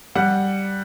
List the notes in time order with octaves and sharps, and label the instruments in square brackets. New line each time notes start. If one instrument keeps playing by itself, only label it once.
[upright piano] G3 F#5